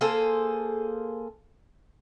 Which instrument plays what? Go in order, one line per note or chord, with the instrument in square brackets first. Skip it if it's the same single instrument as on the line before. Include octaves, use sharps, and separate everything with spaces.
[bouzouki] A#3 G#4 A4 C5